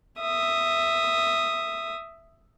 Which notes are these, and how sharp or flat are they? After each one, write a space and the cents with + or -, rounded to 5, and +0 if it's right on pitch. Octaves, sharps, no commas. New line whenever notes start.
E5 +5 D#6 +0